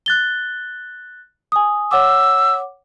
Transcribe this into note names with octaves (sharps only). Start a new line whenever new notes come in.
F#6 A6 G7
G#5 D#6
C#5 F#5 D6 E6